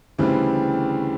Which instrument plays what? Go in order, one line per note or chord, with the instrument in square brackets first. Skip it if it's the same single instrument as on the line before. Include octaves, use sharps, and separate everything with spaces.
[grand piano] D2 C#3 E3 G3 C4